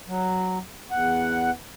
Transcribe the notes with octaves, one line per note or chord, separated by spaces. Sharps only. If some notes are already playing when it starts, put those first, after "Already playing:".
F#3
E2 F#5